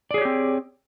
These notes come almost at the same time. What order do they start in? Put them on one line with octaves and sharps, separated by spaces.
D5 G#4 C#5 G4 C4